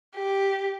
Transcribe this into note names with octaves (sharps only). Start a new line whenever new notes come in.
G4